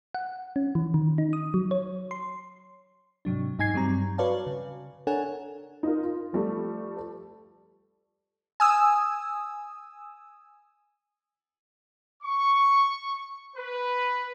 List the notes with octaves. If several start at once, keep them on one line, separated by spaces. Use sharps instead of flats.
F#5
C#4
E3
D#3
D#4
D#6
F#3
C#5
C6
G#2 C3 F#3 D4
G#2 D#4 G#5 G#6 C7
G2 F#3 G3 C4 A#5
F#4 B4 C#5 D5 F5 A5
C#3
D4 A4 A#4 C#5 F#5 G#5
D#4 F4 A#4
F4
F3 G3 A3 A4
A4
G#5 D#6 E6
C#6
B4